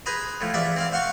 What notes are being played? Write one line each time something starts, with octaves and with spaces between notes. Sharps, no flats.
G#4 B4 C5 A#5 B5 D#6
A2 F3
E2 F3 D5 E5
C4 C5 F5
C5 F5 F#5 C6 C#6